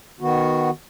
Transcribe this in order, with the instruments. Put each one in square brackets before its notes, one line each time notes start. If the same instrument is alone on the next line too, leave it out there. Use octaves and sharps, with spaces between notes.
[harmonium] D#3 B3 F#4